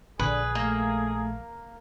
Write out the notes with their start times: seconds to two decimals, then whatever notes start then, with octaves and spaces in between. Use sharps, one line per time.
0.19 A#1 D3 G#4 B4
0.55 A3 A#3